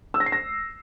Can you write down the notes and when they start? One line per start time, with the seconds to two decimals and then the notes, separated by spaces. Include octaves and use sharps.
0.14 E6
0.20 A#6
0.26 C7
0.32 A#6